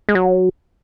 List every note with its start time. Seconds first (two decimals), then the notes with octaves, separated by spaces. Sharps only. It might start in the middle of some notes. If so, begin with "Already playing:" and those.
0.09 G#3
0.15 F#3